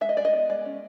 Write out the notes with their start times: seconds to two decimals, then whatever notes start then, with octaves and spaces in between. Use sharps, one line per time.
0.01 G#3 E5
0.09 D#5
0.17 G#3 D5
0.25 D#5
0.33 B3
0.50 G#3 D5
0.65 C#4